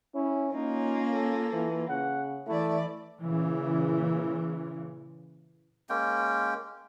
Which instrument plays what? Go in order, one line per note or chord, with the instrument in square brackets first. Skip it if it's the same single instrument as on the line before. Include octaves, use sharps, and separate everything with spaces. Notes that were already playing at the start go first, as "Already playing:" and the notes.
[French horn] C#4 [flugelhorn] E4
[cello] A#3 F4 [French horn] C#4 [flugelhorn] D#4
[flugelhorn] A4
[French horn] E3
[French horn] C#3 [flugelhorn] F#5
[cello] E3 D5 [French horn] A3 [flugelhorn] E4
[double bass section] A#2 C#3 E3
[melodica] G#3 A#3 C#4 G5